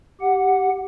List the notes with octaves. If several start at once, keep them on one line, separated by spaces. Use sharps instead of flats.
G4 F#5